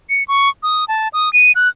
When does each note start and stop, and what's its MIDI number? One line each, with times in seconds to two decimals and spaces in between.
0.10 0.24 97
0.28 0.49 85
0.63 0.85 87
0.88 1.08 81
1.13 1.32 87
1.33 1.52 99
1.55 1.69 90